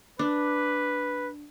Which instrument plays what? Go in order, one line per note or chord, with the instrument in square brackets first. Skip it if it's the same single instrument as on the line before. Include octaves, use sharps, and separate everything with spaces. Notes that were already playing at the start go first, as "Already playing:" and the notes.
[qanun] D4 [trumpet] B4